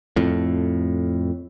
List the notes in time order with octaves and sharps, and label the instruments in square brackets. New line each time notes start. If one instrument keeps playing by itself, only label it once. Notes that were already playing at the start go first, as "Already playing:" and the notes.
[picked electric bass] F2 A2